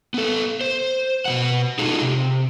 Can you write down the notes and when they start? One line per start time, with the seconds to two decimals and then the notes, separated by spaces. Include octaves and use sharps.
0.14 B3 A4
0.61 C5
1.26 B2 E3 F#5
1.79 D#4 F4 F#4 G#4 A4
2.01 C3